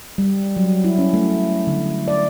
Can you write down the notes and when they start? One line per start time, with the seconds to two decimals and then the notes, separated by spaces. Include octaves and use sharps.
0.18 G3
0.57 F#3
0.84 E4
0.99 C#4
1.14 A3
1.67 D3
2.08 D5